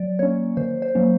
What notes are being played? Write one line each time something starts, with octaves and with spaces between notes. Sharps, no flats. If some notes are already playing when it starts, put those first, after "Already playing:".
Already playing: F#3 D5
A#3 C#4 C#5
D#3 C5
C5
F#3 A#3 C#4